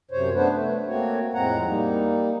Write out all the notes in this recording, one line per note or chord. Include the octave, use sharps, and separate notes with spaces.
F#2 C3 C5 C#5
A3 B3 D4 B4 C5
A3
A3 A#3 C4 F#4 C#5
F2 A2 G#3 C4 F#5 A#5
G3 A#3 D#4